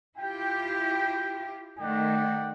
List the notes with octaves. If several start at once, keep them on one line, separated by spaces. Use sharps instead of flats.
E4 F4 G4 G5
D#3 A3 D5 F#5 G5